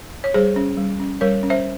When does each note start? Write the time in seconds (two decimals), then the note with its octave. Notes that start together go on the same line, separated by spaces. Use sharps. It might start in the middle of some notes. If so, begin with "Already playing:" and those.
0.24 C#5
0.34 G3 G#4 C5
0.56 C#4
0.77 G3
1.00 C#4
1.21 G3 A#4 C#5
1.43 C#4
1.50 C5 E5